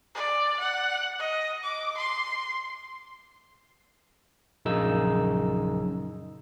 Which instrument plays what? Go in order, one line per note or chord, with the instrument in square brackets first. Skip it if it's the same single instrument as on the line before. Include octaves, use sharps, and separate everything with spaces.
[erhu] D5
F#5
D#5
D6
C6
[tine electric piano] A#1 F#2 C#3 D#4 G#4 E6